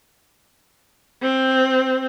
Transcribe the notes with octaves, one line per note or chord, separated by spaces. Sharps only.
C4